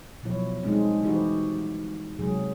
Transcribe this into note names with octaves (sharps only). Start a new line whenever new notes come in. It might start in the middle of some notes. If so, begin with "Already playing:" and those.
B2 F3 F#3 E4 C#5
G3 G#3 C4 D4 D#4
E3 D#4 E4 F#4 G4 C5
F#4
C3 F#3 G#3 G#4